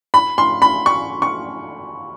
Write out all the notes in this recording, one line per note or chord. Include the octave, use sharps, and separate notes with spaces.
B5
C6
B5
C#6
C#6